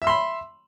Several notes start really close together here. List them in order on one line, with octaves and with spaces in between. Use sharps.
E5 E6 C6 B5